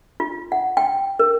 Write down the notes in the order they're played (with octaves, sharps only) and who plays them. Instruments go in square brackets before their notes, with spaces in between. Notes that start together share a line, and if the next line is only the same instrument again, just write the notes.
[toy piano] F4
F#5
G5
A#4